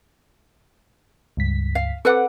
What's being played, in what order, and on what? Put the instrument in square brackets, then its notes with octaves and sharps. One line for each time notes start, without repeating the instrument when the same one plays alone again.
[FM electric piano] C#2 G2 B6
[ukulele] F5
[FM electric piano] C4 D6 [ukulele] A4 B4 F#5